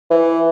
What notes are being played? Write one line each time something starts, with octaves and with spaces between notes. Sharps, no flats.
E3